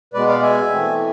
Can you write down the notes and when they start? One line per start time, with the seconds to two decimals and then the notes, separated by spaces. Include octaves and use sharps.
0.14 B2 G#3 B3 B4 D5
0.28 D5 F5
0.42 E5 G#5
0.71 E3 A3 C4